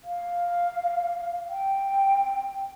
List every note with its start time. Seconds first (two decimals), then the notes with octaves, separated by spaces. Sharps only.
0.04 F5
1.49 G5